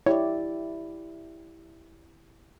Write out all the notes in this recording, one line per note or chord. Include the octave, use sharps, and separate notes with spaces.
E4 G4 C#5 D5